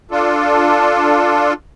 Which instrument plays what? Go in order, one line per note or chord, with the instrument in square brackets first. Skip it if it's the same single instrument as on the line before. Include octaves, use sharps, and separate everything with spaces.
[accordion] D4 F4 A4